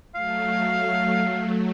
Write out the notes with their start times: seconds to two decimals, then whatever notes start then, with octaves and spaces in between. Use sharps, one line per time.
0.15 F#3 A3 F5